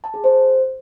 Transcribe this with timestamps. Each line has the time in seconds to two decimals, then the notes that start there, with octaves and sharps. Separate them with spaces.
0.04 A5
0.14 G#4
0.24 C5